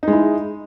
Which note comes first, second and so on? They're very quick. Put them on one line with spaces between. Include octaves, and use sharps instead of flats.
D#4 G#3 E4